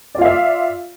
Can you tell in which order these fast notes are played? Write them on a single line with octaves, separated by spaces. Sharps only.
D5 F4 F5 E5